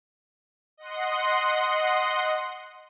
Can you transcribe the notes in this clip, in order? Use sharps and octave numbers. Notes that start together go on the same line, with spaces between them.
D#5 F#5 C6